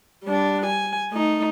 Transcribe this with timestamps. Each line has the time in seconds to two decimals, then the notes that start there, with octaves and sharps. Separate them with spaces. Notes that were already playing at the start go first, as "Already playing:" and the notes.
0.24 G3 D4
0.67 G#5
1.11 A3 D#4